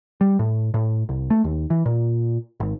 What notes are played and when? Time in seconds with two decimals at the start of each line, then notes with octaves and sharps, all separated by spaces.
0.21 G3
0.39 A2
0.74 A2
1.09 C2
1.30 A3
1.44 D#2
1.70 E3
1.86 A#2
2.60 G#1